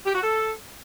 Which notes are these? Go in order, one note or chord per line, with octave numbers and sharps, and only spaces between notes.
G4
F#4
A4